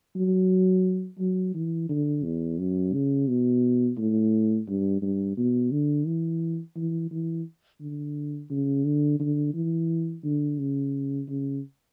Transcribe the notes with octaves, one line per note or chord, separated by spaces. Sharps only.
F#3
F#3
E3
D3
E2
F#2
C#3
B2
A2
G2
G2
B2
D3
E3
E3
E3
D3
C#3
D3
D3
E3
D3
C#3
C#3